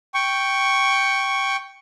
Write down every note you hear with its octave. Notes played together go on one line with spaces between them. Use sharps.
G5 C#6